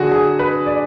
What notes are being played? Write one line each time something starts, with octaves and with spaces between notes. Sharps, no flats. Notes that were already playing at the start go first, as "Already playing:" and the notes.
Already playing: D3 F#3 F#4 G#4
G#4
B4
D5